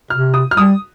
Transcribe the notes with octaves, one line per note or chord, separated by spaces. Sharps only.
C3 F6
D#6
F6
G3 D#6